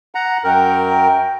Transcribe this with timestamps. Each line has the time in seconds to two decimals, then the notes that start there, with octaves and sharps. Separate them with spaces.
0.15 F#5 A#5
0.44 F#2 A#4 G5